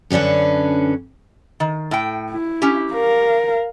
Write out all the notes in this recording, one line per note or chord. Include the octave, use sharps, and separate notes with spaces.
F#2 D3 C#4 D4 B4
D#3
A2 G5
E4
C#4 G4
A#4 F5